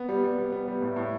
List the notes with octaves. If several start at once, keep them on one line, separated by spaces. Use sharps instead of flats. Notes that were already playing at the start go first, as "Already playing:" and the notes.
Already playing: B3
G3
G3
G3
B3
G3
A2
A2